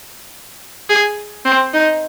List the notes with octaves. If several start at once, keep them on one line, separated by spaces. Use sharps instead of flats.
G#4
C4
D#4